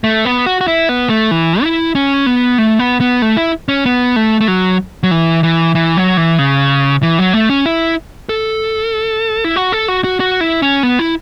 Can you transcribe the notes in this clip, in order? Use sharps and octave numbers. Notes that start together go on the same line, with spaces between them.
A3
B3
F#4
F#4
E4
B3
A3
E3
E4
C#4
B3
A3
B3
B3
A3
E4
C#4
B3
A3
A3
F#3
F#3
E3
E3
E3
F#3
E3
C#3
E3
F#3
A3
C#4
E4
A4
E4
F#4
A4
F#4
F#4
F#4
E4
C#4
B3
E4